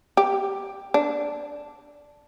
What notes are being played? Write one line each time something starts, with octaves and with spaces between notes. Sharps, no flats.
G4
D4